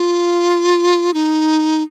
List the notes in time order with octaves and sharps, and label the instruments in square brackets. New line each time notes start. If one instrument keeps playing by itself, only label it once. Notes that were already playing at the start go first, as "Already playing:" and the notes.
Already playing: [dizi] F4
D#4